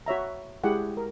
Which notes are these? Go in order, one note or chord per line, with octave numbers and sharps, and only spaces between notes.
F#4 C#5 E5 A#5
G#3 E4 G4 G#4 F#5
A#4